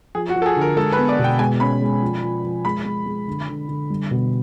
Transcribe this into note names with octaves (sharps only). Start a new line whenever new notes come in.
F3 G#4
F#4
F3
A4
G#4
D3 A#4
G#3 A4
B4
B3
D5
B2
G5
G#3 G#5
C#4 B5
G#3
F3
F3
F3
G#3 B5
G#3
G#3
D3
D3
D3
G3
B2